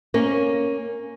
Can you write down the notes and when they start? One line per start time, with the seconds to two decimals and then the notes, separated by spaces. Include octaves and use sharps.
0.14 A#3 C#4